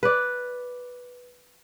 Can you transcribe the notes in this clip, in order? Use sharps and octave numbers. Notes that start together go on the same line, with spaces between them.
B4 D5